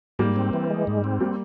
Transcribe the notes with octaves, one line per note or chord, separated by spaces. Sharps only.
G#2 G3 A#3
C4
E3
G#3
G#2
C4
G3 A#3